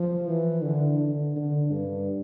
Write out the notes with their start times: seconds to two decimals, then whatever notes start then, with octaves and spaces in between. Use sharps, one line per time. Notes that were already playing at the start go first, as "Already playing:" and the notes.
Already playing: F3
0.27 E3
0.63 D3
0.99 D3
1.36 D3
1.71 G2